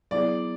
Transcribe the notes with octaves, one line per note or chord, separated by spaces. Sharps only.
F#3 B3 E4 G#4 D5